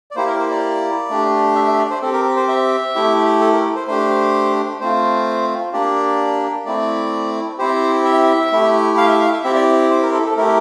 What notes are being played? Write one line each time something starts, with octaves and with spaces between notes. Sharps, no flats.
D5
A#3 E4 G4 C5
A#4
C5
D5
A3 D4 G4
E5
E5
D5
C5
C4 G4 A4
A#4
C5
E5
A3 E4 G4
A4
A#4
C5
A3 D4 G4 C5
A3 C4 F4 C5
A#3 D4 G4 D5
A3 C4 E4 D5
C4 E4 G4 C5
E5
A3 E4 G4
F5
E5
F5
E5
C4 E4 G4 E5
D5
C5
A#4
A4
A4
A3 E4 G4 A#4